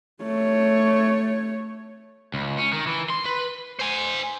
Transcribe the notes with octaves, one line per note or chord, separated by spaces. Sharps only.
A3 C#5
C#2
C#4
D#3
E3
C6
B4
C5 G#5